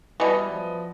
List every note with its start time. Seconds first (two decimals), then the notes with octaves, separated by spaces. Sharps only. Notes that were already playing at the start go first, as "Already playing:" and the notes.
0.20 B2 E3 G3 B4 D5 D#5
0.50 F3